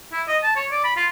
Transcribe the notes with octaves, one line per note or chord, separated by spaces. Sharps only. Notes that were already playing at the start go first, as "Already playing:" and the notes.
E4
D#5
A5
C#5
D5
B5
F4